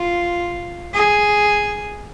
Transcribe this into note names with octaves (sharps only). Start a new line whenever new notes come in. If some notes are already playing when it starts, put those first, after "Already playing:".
Already playing: F4
G#4